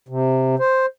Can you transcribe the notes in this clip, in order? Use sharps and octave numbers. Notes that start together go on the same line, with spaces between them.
C3
C5